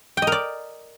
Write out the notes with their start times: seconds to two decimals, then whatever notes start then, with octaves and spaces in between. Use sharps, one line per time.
0.17 G5
0.22 D#5
0.27 A#4
0.32 D5